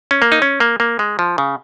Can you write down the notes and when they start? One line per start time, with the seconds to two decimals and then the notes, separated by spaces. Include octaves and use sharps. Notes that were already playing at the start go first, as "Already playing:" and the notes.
0.11 C#4
0.22 A#3
0.32 D#4
0.42 C#4
0.60 A#3
0.80 A#3
0.99 G#3
1.19 F3
1.38 C#3